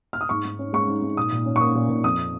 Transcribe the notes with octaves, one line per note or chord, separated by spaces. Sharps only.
F6
D#6
G#2 C#6
G#2
C#4
G#3 C#6
G#2
G#2
A#2 D#6
A#2
C#4
C#6
A#3 D#6
A#2
A#2
F2 D#6